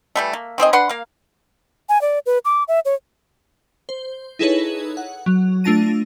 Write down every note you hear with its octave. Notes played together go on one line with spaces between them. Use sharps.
E3 G3 A3
A#3
D#3 C4 G#4 D#5
D4 B4 F#5 C6
A#3 F5
G#5
D5
B4
D6
E5
C#5
C5
D#4 E4 G#4 A4 B4 C#5
F#5
F#3
A3 D4 F4 A5 A#6 D#7